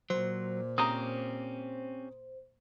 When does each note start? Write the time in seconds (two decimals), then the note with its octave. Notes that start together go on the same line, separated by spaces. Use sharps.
0.10 A#2 F#3 C5
0.78 C4 C#4 G4 A#5 D#6